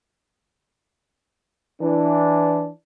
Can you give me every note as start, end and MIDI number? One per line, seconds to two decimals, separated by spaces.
1.81 2.70 52
1.81 2.70 62